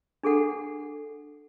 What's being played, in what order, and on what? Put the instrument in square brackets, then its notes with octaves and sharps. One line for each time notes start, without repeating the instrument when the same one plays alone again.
[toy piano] D4 G#4 A4 F#5